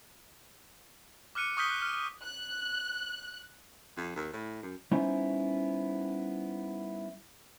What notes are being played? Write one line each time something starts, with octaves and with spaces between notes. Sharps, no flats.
D6 F6 F#6 C#7 D#7
C#6 D#6 F6 G6 B6 G7
F#6
F6
F#6
F2
D#2
A2
F#2
G3 B3 C#4 D#4 E4 C5